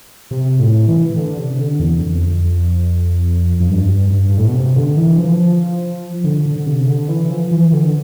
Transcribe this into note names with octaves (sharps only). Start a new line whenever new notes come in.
C3
A2
E3
D3
C3
D3
E2
F2
F2
G2
G2
G2
A2
B2
C3
D3
E3
F3
D3
D3
D3
C3
D3
E3
F3
E3
D3